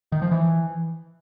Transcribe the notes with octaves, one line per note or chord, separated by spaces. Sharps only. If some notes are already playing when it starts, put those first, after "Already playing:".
D#3
F3
E3